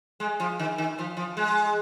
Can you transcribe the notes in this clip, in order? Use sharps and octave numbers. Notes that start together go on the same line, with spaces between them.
G#3
F3
D#3
D#3
F3
F3
G#3